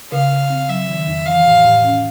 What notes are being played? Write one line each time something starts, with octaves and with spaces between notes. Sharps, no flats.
C#3 F5
C#3
C4
F#3 E5
D#3
F2
E3 F5
A2
A2
C#4